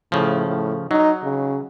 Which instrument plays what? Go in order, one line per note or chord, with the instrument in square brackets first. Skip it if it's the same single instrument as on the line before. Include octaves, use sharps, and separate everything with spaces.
[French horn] A2 [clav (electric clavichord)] C#3 F3
[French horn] A2
[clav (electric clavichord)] F#3 [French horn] D#4
[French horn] C#3